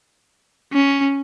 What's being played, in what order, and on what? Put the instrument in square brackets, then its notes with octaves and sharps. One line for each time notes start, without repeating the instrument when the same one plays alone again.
[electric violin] C#4